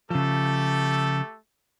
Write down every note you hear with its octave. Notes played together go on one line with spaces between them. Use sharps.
C#3 F3 A3 G4 A4